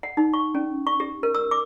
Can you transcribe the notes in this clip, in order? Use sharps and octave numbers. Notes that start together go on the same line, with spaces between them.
F#5
D#4
C#6
C#4
C#6
G4
A#4
E6
D6